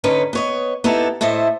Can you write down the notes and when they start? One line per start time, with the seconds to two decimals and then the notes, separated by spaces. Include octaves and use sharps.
0.04 D3 C#4 D#4 B4 C#5
0.33 B3 C#5 D#5
0.84 B3 D#4 E4 G4 A4
1.21 A2 E4 A4 C5 D#5